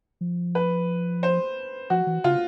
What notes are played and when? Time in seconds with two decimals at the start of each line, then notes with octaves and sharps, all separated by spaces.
0.21 F3
0.55 B4
1.23 C5
1.90 F3 F#4
2.07 E3
2.24 C#3 F4